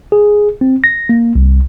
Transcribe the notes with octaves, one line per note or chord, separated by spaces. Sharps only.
G#4
C4
A#6
A#3
C2